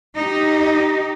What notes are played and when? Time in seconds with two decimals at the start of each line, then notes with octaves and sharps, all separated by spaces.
0.17 D#4 G4